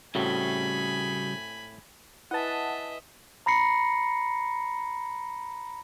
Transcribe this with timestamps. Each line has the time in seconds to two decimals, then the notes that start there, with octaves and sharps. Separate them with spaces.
0.15 A2 C#3 G3 C4 F#4 G#5 B5
2.31 E4 B4 D#5 E5 F#5 G#5 A5
3.46 A#5 B5 A#6 C7 C#7